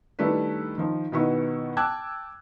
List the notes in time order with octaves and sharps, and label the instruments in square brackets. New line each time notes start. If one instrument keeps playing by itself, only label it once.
[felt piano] D#3 G3 A3 D4 E4 B4
D#3 F3
B2 D#3 B3 E4 C#6
G5 A5 D6 E6 F#6 G#6